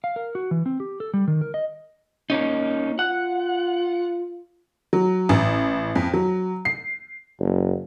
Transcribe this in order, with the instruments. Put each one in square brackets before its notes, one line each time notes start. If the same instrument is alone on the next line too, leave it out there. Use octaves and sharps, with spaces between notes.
[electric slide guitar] F5
A#4
F#4
E3
C4
G4
A4
G3
D#3
A#4
D#5
A#3 C#4 D#4
[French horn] F4 [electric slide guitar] F#5
[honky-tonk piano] F#3
A1
F2
F#3
C7
[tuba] F#1